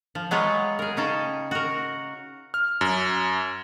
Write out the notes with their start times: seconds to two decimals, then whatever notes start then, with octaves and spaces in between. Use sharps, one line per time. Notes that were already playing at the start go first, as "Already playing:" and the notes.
0.15 F3
0.31 F#3 G#3 B3 F4 C#5
0.79 G#4 A#4
0.97 C#3 C#4 D#4 G5 A5
1.51 F#4 A#4
2.54 F6
2.81 F#2